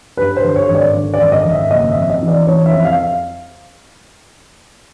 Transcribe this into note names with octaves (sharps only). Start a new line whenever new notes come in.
G2 B4
C5
D3
C#5
G#1
D5
D3
D5
G#1
D#5
G#1
E5
F#1 D#5
E5
F2
D#5
E3
D5
E3 C#5
E5
F2
F5